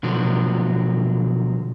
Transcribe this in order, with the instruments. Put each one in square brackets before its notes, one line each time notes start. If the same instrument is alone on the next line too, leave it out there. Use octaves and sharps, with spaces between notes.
[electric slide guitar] B2 D3 F3 F#3